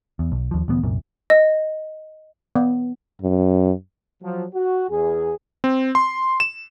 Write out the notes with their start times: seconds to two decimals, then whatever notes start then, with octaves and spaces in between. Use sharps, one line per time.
0.19 E2
0.32 B1
0.51 D#2 F3
0.68 D2 A#2 E3 B3
0.83 C2 F#2 A#2
1.30 D#5
2.56 B3
3.22 F#2
4.23 F3 F#3
4.54 F#4
4.90 E2 G#4
5.64 C4
5.95 C6
6.40 E7